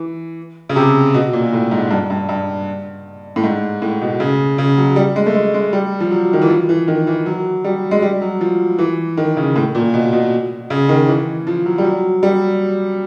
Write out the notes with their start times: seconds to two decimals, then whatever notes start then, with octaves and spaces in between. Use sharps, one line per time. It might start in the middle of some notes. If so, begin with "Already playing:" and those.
Already playing: E3
0.69 C#3
0.76 C3
1.14 B2
1.33 A#2
1.53 A2
1.71 G#2
1.91 G2
2.10 G2
2.29 G2
3.36 A2
3.44 G#2
3.82 A2
4.01 B2
4.20 C#3
4.58 C#3
4.78 F#3
4.96 G3
5.16 G#3
5.26 A3
5.35 G#3
5.54 G#3
5.73 G3
6.00 F3
6.11 F#3
6.33 D#3
6.42 E3
6.49 F3
6.69 E3
6.88 D#3
7.07 E3
7.26 F#3
7.64 G3
7.91 G#3
8.02 G3
8.21 F#3
8.41 F3
8.79 E3
9.17 D#3
9.37 C#3
9.56 A2
9.75 A#2
9.94 B2
10.13 B2
10.70 C#3
10.89 D#3
11.08 E3
11.47 F3
11.66 F#3
11.78 G3
11.85 F#3
12.23 G3